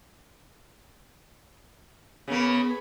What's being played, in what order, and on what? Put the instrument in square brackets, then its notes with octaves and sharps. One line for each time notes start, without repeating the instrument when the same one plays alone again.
[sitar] C#3 A#3 [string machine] B3 [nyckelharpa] G#4 B5